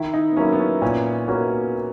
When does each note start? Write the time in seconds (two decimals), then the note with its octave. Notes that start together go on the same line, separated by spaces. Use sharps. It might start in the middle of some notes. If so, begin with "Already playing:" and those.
Already playing: D#3 E4
0.14 D#4
0.32 B3
0.37 F#3 A#3 C#4 E4
0.53 B3
0.59 C#4
0.82 A#2 C#4
1.28 A#3 B3 C#4 F#4